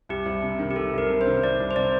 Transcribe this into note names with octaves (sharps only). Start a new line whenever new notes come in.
C2 G4
C2
C3
D#3
G4
C2 A4
C2 A#4
C3
C5
D#3
C2 D5
C2
C5
C3 D5